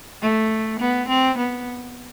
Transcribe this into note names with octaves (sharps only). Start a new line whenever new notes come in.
A3
B3
C4
B3